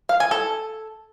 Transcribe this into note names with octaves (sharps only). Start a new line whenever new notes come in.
F5
G#5
A4